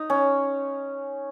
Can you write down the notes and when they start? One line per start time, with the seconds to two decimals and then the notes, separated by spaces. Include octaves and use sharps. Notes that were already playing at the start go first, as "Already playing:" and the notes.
Already playing: D#4
0.10 C#4